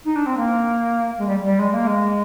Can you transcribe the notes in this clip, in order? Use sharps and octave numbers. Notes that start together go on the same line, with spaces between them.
D#4
D4
C4
A#3
G#3
G3
G3
G#3
A#3
G#3